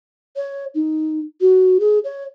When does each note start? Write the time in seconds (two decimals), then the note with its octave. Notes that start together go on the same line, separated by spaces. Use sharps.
0.36 C#5
0.75 D#4
1.41 F#4
1.80 G#4
2.04 C#5